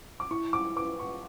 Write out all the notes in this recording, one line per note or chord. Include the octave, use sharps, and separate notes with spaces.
D6
E4 C#6
E4 D6
B4 D6
F#5 C#6